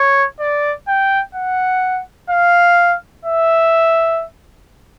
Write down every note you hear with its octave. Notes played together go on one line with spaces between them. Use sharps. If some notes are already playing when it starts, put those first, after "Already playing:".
Already playing: C#5
D5
G5
F#5
F5
E5